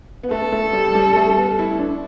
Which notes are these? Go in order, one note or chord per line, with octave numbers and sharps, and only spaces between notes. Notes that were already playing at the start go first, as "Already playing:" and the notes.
B3
A3 A4
A3
G3
G3
A3
B3
E4
D4